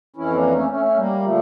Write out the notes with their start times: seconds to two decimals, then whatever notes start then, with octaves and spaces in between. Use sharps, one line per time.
0.16 F2 E3 C#4 E4
0.34 A#3 D4
0.52 A3 C#4
0.70 A3 C#4
0.85 C#4
0.97 G3 A#3
1.22 D3 F3 A3